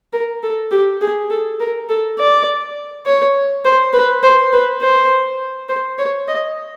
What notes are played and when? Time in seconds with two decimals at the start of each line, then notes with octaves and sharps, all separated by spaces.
0.13 A#4
0.43 A4
0.71 G4
1.01 G#4
1.30 A4
1.60 A#4
1.89 A4
2.19 D5
3.06 C#5
3.65 C5
3.93 B4
4.23 C5
4.52 B4
4.81 C5
5.69 C5
5.98 C#5
6.28 D#5